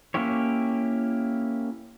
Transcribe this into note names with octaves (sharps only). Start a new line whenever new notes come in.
A#3 C#4 E4 G4 C#5